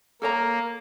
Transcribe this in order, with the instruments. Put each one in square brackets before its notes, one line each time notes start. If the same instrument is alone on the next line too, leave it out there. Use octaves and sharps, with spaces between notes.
[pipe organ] A#3 [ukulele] A4 C#5 A#5